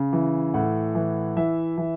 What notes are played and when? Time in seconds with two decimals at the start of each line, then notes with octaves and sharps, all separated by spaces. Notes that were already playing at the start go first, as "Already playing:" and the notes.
Already playing: C#3
0.13 E3
0.54 A2 F#5
0.95 E3
1.37 E3 E5
1.78 E3